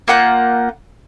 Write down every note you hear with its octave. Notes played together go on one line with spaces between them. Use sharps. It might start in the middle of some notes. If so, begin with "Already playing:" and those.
A#3 F4 F#5 G6